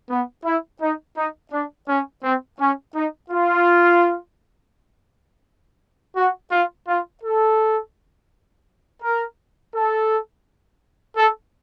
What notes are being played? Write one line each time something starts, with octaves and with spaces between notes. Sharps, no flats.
B3
E4
D#4
D#4
D4
C#4
C4
C#4
D#4
F4
F#4
F4
F4
A4
A#4
A4
A4